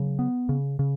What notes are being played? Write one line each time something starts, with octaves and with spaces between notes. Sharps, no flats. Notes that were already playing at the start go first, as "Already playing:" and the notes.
Already playing: C#3 F#3
B3
C#3
C#3